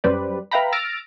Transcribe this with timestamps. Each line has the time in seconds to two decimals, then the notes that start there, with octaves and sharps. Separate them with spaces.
0.04 F#2 G3 B4 C5 D5
0.51 B4 E5 F5 G5 A#5 B5
0.72 E6 F6 A6 A#6 D7